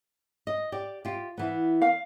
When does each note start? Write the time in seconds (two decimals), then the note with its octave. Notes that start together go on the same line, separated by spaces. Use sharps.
0.47 D#5
0.72 G4 D5
1.05 F4 G4
1.37 E3 B3
1.82 F5